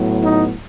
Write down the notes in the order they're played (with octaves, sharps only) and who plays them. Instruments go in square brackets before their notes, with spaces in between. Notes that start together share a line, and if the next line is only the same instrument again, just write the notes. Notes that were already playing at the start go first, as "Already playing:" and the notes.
Already playing: [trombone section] A2 F#3 B3
D#4